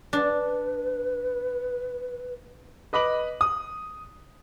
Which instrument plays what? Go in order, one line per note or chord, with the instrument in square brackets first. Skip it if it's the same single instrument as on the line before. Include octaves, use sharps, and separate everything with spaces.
[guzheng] D4 [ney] B4
[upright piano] B4 D#5 B5 D6 F#7
D#6